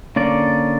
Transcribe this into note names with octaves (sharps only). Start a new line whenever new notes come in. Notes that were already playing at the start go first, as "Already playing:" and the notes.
D3 A#3 C#4 D5